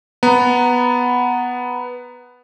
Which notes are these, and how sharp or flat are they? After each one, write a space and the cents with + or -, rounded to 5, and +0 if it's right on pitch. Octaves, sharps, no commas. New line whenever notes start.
B3 +0 A#5 +0